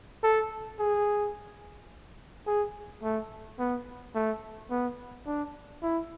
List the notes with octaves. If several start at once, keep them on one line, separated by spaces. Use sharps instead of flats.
A4
G#4
G#4
A3
B3
A3
B3
D4
E4